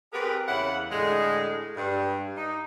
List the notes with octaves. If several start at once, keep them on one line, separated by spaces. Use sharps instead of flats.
C4 G4 G#4 A#4 B4
E2 C#3 E4 F#5
A2 D3 G#3
G2
D#4